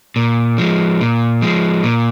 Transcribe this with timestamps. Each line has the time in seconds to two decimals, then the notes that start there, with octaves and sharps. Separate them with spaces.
0.16 A#2
0.58 F3 G#3
1.01 A#2
1.42 F3 G#3
1.84 A#2